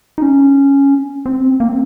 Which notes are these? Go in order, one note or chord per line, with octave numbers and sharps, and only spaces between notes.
D#4
C#4
C4
A#3
C4